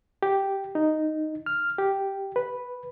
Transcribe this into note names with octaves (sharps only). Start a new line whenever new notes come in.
G4
D#4
F6
G4
B4